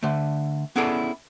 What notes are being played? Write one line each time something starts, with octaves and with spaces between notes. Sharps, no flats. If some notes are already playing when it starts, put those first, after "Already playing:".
D3 A3
B3 C#4 E4 G#4 A4 D5